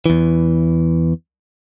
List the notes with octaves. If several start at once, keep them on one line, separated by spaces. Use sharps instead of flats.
E2 E3